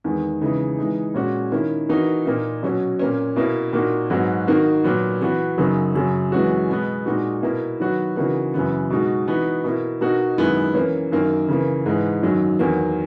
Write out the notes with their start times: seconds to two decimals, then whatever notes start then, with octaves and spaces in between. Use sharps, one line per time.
0.04 E2 D#3 G#3
0.41 C#3 E3 G#3 D#4
0.78 E3 G#3 D#4
1.14 A#2 G#3 C#4 F#4
1.52 D#3 A#3 C#4 E4
1.89 E3 A#3 D#4 F#4
2.26 A#2 A#3 D#4
2.63 B2 F#3 C#4 F#4
2.99 A#2 A#3 C#4
3.36 B2 A#3 E4
3.73 A#2 A#3 D#4 F#4
4.10 G#2 F#3 B3 F#4
4.48 D#3 A#3 D#4 F#4
4.84 A#2 F#3 B3
5.21 E3 B3 F#4
5.58 F#2 C#3 F#3 A#3 D#4
5.95 F#2 C#3 F#3
6.32 F#2 E3 G#3 C#4 F#4
6.69 B2 G#3 B3
7.06 A#2 G#3 D#4 F#4
7.43 B2 A#3 E4
7.80 D#3 F#3 B3 F#4
8.16 C#3 E3 A#3 D#4 F#4
8.54 F#2 C#3 E3 B3
8.90 B2 G#3 D#4 F#4
9.27 E3 B3 D#4 F#4
9.64 B2 A#3 E4
10.01 B2 A#3 D#4 F#4
10.38 F#2 D#3 G#3 B3 E4
10.74 E3 A#3 C#4
11.12 F#2 D#3 A#3
11.49 C#3 E3 A#3
11.86 G#2 E3 G#3
12.23 F#2 D#3 F#3
12.59 E2 D#3 F#3 A#3